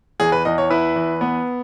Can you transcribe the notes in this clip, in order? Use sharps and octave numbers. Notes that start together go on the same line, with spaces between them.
E2 G#4
B4
E2 D#5
C#5
E4 B4
E2
B3